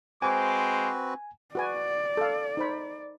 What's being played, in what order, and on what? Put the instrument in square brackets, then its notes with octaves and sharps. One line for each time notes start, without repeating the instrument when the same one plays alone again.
[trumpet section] G#3 C5 D6 [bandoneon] C4 F#4 B4 [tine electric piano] G#5
[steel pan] F#4 B4 G#5 [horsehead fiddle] D5
[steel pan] A4 F5
D#4 C5 B5